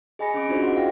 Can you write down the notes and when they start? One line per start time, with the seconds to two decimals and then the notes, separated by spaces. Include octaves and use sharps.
0.19 G#4 D#5 G#5 B5 A#6 C#7
0.34 C4 C#4 G#4 D6 D7
0.49 D4 F4 F#4 G#4 C5 D#5
0.62 E4 F#5 C6
0.76 F5 G5 A#6